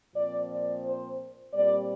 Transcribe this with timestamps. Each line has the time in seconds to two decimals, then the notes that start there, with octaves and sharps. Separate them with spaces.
0.14 A#2 F3 C4 D5
0.49 D5
0.84 C5
1.53 A#2 G3 C4 D5